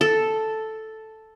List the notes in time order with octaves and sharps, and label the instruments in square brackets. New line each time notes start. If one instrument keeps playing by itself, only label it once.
[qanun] A4